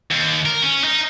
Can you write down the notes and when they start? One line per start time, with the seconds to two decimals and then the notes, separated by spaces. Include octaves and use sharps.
0.12 D#2
0.46 A#4
0.62 C#4
0.84 D#4